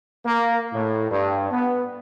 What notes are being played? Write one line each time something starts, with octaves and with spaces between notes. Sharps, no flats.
A#3
A2
G2
B3